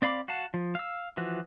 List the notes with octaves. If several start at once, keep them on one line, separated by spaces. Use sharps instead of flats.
C4 D5 F5 B5 D6
F#4 F5 F#5 A5
F3
F5 E6
E3 F3 F#4